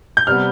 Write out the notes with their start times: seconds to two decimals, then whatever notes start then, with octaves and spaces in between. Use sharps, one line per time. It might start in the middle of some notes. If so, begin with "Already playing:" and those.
0.17 G6
0.27 C3 G3 B3 F6